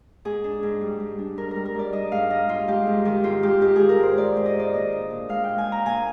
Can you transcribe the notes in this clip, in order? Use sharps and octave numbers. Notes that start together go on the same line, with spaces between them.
G#2 G#4
D4
G#2
G3
G#2
D4
G#2 A#4
G3 A#4
A#4
G#2 D5
D4 D#5
G#2 F5
G3 D#5
G#2 F4
G#3 G4
G#2
D#3 G4
G#2 F4
G#3 G4
G#2 G4
D#3 G#4
A#4
G#2 C5
G#3 D5
G#2
D#5
D#3 D5
A#2 D#5
D4
A#2
G#3 F5
A#2 G5
G#5
D4 A#5
A#2 G#5